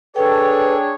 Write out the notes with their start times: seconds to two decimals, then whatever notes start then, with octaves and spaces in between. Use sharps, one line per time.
0.16 D4 G#4 A4 B4 C#5 G5